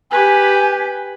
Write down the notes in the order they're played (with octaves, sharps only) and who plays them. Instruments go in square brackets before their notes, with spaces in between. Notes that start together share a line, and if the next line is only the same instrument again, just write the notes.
[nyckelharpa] G4 B4 [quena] G#5